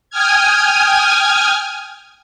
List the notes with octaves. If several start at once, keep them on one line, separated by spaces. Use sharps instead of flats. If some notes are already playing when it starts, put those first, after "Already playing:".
G5 G#5 D#6 F6 G#6